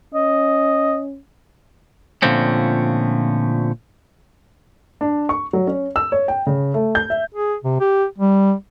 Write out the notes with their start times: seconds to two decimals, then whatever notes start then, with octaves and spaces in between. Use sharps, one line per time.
0.14 C#4 D#5
2.22 A#2 D3 F3 A3 C4 C#4
5.01 D4
5.29 C#6
5.53 F#3
5.67 C#4
5.96 E6
6.12 C#5
6.28 G5
6.47 C#3
6.74 A3
6.95 G6
7.10 E5
7.35 G#4
7.64 C3
7.80 G4
8.18 G3